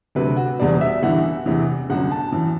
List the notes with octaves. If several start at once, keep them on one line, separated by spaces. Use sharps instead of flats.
D2 C3 F#3 B4
F#4
F#1 E2 B2 G3 D5
E5
G1 G2 E3 F#5
E2 C3 E3
G1 F#2 F#3 F#5
A5
F#2 E3